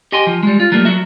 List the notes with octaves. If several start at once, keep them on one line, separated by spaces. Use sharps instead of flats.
G4 D#5 G5 G#5 C6
F3
G3 G#3
F4
F#3 G3 A3 A#3
F#3 F#4 E5